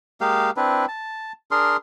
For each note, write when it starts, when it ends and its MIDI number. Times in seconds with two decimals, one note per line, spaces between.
0.21 0.50 56
0.21 0.50 58
0.21 0.50 67
0.21 0.50 77
0.57 0.85 60
0.57 0.85 62
0.57 0.85 64
0.57 0.85 71
0.88 1.32 81
1.51 1.77 62
1.51 1.77 68
1.51 1.77 70
1.51 1.77 84